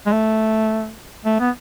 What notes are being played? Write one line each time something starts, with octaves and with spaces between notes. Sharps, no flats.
G#3
A3
A3
B3